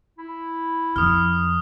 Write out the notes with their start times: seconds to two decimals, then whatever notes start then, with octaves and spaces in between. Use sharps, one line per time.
0.18 E4
0.96 F2 D#6 F6